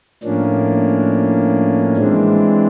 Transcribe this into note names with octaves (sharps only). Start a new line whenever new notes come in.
A2 F3 A#3 C#4 D4
E3 G#3 C4 D4